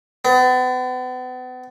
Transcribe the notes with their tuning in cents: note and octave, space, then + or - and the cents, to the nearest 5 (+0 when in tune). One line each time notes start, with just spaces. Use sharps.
B3 +40